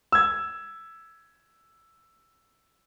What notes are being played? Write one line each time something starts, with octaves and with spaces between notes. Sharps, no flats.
E6 G#6